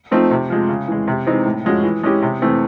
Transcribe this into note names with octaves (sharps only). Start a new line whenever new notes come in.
F3 A3 C4 D#4
C3
F3 G#3
C#3
E3 G#3
C3
E3 G#3 C4 D#4
A2
F3 G#3 C#4 F#4
E3
G#3 C#4 E4 G4
C3
E3 A3 C4